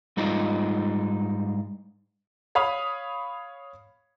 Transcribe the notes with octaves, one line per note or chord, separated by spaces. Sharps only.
G#2 G3 D#4 F4
C#5 F5 B5 D#6